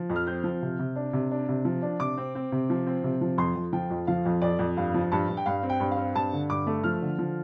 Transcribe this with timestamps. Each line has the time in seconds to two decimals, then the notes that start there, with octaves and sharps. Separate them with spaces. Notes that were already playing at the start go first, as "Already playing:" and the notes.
Already playing: F3
0.10 F2
0.16 F6
0.27 C4 G6
0.44 F3
0.62 C3
0.79 C3
0.96 D4
1.13 C3
1.31 D4
1.49 C3
1.65 F3
1.82 D4
2.00 C3 D6
2.17 C4
2.35 C4
2.52 C3
2.70 F3
2.87 C4
3.04 C3
3.21 F3
3.38 F2 C6
3.56 F2
3.73 F3 G5
3.90 F2
4.07 F3 F5
4.25 F2
4.42 F2 D5
4.59 F2
4.77 G2 F5
4.94 F3
5.12 G2 A5
5.29 G2
5.37 G5
5.46 G2 F5
5.63 C4
5.70 G5
5.80 G2
5.91 F5
5.97 C4
6.15 G2 A5
6.33 D3
6.50 G2 D6
6.67 A3
6.84 F3 F6
7.02 D3
7.19 F3